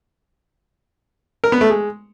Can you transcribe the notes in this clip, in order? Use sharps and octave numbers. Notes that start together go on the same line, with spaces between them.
A#4
B3
A3
G#3